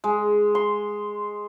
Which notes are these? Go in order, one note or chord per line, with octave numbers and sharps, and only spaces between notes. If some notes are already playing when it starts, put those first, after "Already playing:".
G#3
C6